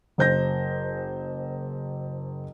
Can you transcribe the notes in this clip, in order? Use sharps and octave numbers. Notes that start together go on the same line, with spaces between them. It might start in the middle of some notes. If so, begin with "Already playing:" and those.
F#1 C5 G6 A#6